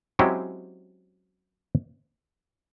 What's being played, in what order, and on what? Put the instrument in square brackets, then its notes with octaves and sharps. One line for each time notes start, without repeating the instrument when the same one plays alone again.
[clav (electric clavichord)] F#3 G#3 C4 C#4 E4 G4